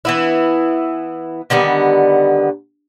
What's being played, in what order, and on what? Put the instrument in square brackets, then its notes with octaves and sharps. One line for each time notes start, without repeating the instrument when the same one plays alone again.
[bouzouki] E3 B3 E4
D3 D#3 G3 B3